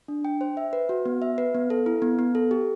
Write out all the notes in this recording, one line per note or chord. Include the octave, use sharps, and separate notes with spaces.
D4
G5
C5
E5
B4
F#4
B3
E5
B4
B3
A4
E4
B3
B3
A4
G4